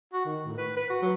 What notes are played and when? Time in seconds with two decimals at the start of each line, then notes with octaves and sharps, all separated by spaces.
0.13 F#4
0.26 D#3
0.46 A2
0.58 B4
0.77 B4
0.90 F#4
1.02 F#3